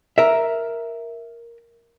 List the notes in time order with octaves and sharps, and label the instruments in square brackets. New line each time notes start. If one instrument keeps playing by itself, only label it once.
[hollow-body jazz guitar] A#4 E5